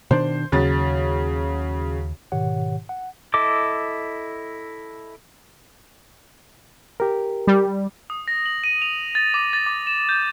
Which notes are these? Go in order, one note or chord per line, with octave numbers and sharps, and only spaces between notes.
B2 D#3 D4 C5
D#2 C#3 F#3 A6
G#2 B2 D#3 G4 C#5 F#5
F#5
E4 A4 D#5 D6
G4 A#4
G3
D#6
A#6
F#7
D#7
F7
A6
D6
A6
D6
E7
G6